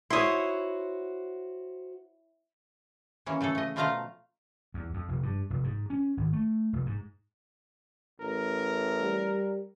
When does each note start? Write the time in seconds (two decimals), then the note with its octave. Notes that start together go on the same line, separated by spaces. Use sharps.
0.10 E4 F#4 C5 C#5 C6 D#6
3.26 E3 A#3 C#4
3.41 C#3 A3 G#4 A4
3.55 A3 D#5
3.76 B2 F3 A3 F4 F5 A#5
4.74 E2
4.94 F2
5.08 F1
5.23 G2
5.50 F1
5.64 G#2
5.90 C#4
6.17 G#1
6.33 A3
6.73 F1
6.86 G#2
8.20 A1 A#4
9.01 G3